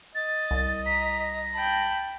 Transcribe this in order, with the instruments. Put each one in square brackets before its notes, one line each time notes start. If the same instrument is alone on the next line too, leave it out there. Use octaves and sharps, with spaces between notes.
[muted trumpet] D#5 [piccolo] A6
[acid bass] C2
[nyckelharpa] A#5 [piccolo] B6
[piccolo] A#6
[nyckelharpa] G5 B5 [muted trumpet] A5